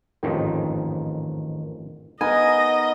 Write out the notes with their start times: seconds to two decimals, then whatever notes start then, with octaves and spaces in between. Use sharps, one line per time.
0.23 A1 F2 G#2 D#3
2.21 B3 D#4 A#4 D#5 G#5